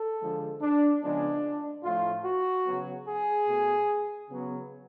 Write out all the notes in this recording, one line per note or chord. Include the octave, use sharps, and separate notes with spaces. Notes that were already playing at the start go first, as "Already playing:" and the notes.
Already playing: A4
D3 F3 G#3
D4
C#3 F3 G#3 B3 D4
A2 F3 A3 F4
F#4
C#3 F#3 B3
G#4
B2 A3
C#3 F#3 B3